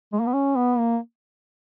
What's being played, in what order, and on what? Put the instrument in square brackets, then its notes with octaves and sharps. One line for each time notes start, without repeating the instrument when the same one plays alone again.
[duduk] G#3
A#3
B3
C#4
B3
A#3